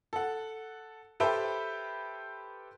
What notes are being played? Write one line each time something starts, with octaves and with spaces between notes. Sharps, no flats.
A4 F#5
G4 A4 B4 C5 E5 G5